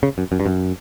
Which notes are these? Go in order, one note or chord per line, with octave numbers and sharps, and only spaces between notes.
C#3
F#2
F#2
G2
F#2